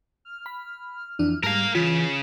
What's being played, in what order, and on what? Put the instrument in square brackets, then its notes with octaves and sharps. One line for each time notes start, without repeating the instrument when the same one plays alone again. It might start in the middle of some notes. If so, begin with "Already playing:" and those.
[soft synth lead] F6
[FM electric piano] B5
F2 E3 D4
[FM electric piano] G#2 A5 F6 [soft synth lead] G3 [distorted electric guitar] A#4 F5
[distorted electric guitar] C#3 [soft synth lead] E3 [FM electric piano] F4